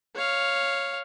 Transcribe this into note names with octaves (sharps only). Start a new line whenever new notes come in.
C#5 F5